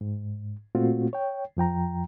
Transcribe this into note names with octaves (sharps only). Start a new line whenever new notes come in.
G#2
A#2 A3 C4 F4 F#4
C#5 G5
F2 F3 G5 A#5